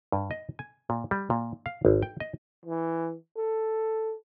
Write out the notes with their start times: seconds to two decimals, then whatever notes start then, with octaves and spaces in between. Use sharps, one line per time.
0.12 G2
0.31 D#5
0.59 G#5
0.90 A#2
1.11 G3
1.30 A#2
1.66 F5
1.85 G#1
2.03 G5
2.20 D#5
2.65 E3
3.37 A4